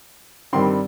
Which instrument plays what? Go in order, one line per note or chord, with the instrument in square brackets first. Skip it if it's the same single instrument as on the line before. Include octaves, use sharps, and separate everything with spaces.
[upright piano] G2 D#3 G3 C4 C6